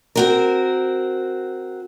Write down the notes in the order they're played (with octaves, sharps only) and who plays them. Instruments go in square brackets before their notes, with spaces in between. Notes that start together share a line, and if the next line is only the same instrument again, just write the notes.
[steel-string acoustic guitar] C4 F#4 A#4